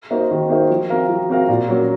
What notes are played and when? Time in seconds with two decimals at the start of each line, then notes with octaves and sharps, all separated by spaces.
0.11 A#3 D#4 F#4 C5
0.31 D#3
0.50 A#3 D#4 F#4 C5
0.70 F3
0.90 C4 F#4 A#4 F5
1.09 F3
1.30 C4 F#4 A#4 F5
1.49 A#2
1.68 F#3 A#3 C#4 F#4